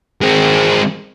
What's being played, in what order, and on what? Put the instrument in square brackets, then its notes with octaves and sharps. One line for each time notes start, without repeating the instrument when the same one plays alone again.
[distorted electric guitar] G#3 C4